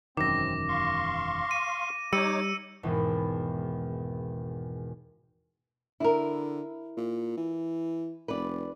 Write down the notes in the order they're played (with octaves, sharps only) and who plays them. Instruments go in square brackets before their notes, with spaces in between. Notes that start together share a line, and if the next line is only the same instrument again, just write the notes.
[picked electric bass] E1 F#2 D#3 [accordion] C4 [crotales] D6 A#6
[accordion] F5 C6 C#6
[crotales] D#7
[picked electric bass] G3 [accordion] D#4 C#5 D6 [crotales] E6 C#7 D#7
[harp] G#1 E2 B2 E3
[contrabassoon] D3 [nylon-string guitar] E4 A#4
[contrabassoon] A#2
E3
[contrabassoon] F1 [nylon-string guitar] B4 D5